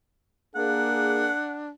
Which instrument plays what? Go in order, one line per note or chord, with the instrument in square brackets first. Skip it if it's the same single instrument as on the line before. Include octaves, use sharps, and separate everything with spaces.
[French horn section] A#3 G#4 [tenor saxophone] D4 [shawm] F#5